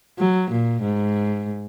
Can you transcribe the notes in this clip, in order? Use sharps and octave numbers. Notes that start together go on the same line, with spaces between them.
F#3
A#2
G#2